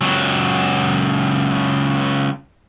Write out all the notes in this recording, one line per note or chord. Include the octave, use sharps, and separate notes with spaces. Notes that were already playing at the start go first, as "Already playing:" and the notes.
C#2 F#3